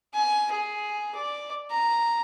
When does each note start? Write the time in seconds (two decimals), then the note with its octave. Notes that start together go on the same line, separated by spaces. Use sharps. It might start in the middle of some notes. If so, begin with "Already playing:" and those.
0.14 G#5
0.52 G#4
1.15 D5
1.71 A#5